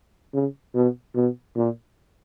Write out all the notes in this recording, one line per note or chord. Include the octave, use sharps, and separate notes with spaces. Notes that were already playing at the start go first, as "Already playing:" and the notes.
C#3
B2
B2
A#2